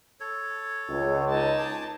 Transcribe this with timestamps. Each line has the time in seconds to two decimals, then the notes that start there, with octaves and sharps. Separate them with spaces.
0.20 A4 C#5
0.89 C#2
1.29 D#4 A5
1.58 G#4 D6